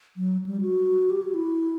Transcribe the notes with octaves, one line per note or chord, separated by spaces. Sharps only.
F#3
G3
F#4
G4
F#4
E4